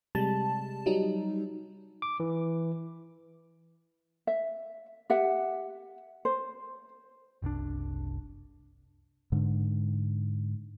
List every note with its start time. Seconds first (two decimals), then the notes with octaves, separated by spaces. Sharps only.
0.15 C3 G3 G#3 A5
0.86 F#3 G3 D#4
2.02 D6
2.20 E3
4.27 E5
5.10 G4 E5 F#5
6.25 C5
7.42 F#1 C2 D4
9.32 G#2 D3